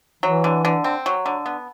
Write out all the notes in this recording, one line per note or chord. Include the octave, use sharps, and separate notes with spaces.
E3 F#3
D3
D3
C4
F#3
D3
B3